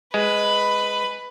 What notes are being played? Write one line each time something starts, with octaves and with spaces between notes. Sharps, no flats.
G#3 B4 B5